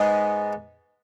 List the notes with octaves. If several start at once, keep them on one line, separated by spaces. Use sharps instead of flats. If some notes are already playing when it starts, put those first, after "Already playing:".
Already playing: G#2 G#3 B3 D#4